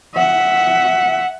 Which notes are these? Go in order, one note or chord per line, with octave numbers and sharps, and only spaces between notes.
E5 F#5